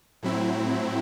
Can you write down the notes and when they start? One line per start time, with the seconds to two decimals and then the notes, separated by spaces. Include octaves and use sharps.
0.23 A2 F#3 C4 E4